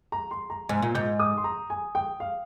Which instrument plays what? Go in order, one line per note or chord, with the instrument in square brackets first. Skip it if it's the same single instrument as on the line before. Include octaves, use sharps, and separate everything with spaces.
[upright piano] A#5
C6
A#5
[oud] G#2 [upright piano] G#5
[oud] A#2
[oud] G#2 [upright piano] G6
[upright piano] D#6
C6
A#5
G#5
G5
F5